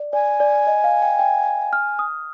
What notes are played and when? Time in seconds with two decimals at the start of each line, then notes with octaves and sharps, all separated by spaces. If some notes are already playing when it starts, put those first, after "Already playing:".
Already playing: D5
0.13 D5 G#5
0.40 D5
0.67 D#5
0.84 F5
1.02 G5
1.19 G5
1.73 F6
1.99 D#6